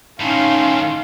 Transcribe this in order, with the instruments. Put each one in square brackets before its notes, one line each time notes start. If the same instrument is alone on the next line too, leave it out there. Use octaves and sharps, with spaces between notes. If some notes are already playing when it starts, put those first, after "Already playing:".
[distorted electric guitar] A2 D#3 [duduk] C#4 [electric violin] D#4 C6 [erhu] F5